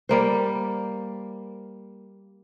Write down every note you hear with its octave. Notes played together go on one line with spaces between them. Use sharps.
G3 A#3 C5